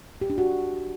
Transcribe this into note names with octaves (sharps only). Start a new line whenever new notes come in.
G4
D4
F#4